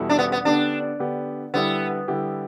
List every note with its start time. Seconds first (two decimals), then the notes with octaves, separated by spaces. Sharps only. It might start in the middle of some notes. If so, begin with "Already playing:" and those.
Already playing: E2 B2 G3 E4 A4
0.10 D4
0.19 B3
0.32 B3
0.45 D3 B3 D4 G4
1.00 D3 B3 G4
1.54 D3 G3 B3 E4 G4
2.08 D3 G3 E4 G4